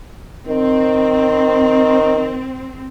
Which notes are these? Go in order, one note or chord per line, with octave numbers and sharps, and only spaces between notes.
D#3 C4